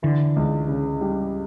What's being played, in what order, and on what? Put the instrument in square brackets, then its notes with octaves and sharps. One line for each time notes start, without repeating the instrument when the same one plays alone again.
[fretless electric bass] D3 [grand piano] E3
[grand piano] C#2
C#3
G3